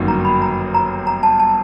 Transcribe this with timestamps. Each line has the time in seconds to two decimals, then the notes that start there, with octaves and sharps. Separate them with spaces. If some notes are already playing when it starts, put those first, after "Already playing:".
Already playing: G1 F#2 D#3 F#3 A#3
0.08 A#5
0.25 B5
0.42 A#5
0.74 A#5
1.07 A#5
1.23 A5
1.40 A5